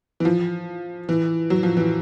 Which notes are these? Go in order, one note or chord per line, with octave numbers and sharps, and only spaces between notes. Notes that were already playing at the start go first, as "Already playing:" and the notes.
E3
F3
E3
F#3
F3
E3